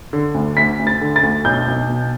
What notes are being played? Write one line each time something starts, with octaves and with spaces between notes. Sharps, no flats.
D3
D2
D2 B6
D2
A6
D3
A6
D2
B1 G6
B1
B2